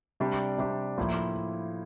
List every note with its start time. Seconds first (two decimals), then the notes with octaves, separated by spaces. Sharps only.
0.20 C3 G3 D4 G4
0.58 C3 G3 D4 G4
0.98 A2 F3 A#3 E4